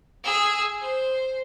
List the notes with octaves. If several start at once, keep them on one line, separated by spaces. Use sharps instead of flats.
G#4 E6
C5